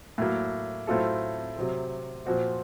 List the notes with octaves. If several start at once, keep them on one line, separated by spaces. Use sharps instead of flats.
A2 F#3 A#3
A2 F#3 C4 F4 A4
C3 F#3 C4
A#2 F3 C4 F#4 C5